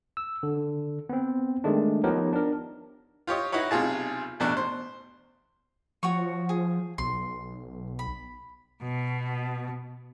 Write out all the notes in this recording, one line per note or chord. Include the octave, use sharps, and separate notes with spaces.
E6
D3
B3 C4
D#3 G#3 A3 D4
F3 B3 D#4 G4 A#4 C#5
D4 A#4
F4 G4 C#5 D#5
D#4 E4 F#4 B4 C#5
B1 C3 F4 G#4 A5
A1 E2 B2 D4 C#6 F#6
C5
F3 F#4 C#5 C#6
G#4
B1 C6
B5
B2